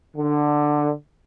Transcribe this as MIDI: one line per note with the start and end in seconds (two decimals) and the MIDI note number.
0.16 0.91 50